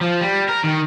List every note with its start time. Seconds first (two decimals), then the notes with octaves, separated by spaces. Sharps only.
0.01 F3
0.20 G3
0.49 A#4
0.64 D#3